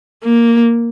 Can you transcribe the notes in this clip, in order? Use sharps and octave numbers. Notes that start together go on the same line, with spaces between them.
A#3